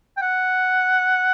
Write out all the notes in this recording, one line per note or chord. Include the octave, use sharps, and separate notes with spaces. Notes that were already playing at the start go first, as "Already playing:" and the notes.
G5
F#5